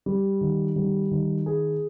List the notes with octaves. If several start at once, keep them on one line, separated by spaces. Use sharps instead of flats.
G3
D#3
G3
D#3
G#4